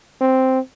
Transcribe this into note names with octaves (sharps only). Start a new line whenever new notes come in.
C4